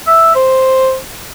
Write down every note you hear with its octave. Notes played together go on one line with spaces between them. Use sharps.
E5
C5